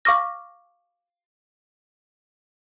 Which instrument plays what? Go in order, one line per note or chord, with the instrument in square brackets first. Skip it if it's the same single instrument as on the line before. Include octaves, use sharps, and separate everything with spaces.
[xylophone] F5 C#6 D6 F6 A#6